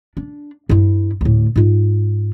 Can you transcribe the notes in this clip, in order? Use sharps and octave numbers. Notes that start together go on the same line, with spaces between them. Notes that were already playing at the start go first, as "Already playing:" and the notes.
D4
G2 E4
D2 A2
G#2 F4